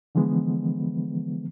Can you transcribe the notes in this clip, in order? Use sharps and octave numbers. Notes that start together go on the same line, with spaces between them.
D3 E3 F3 G#3 B3